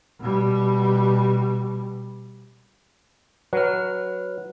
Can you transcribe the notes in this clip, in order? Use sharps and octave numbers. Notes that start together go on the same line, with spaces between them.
B2 G3
F#3 B4 F6